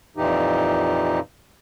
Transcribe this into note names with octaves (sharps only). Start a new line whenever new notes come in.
F2 A#2 E3 D#4 G4